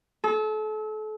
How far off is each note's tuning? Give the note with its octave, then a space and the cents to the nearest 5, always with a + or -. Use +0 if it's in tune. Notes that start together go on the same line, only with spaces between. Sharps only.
A4 -35